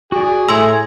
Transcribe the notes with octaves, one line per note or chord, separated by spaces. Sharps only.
F#4 G#4 D5
A2 A3 C#5 G#5 A#5 C6 E6